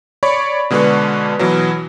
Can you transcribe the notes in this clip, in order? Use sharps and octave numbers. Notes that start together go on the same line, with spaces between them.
C#5 D5 B5 C#6
B2 D3 G#3 D4 B4 C#6
B2 E3 F#3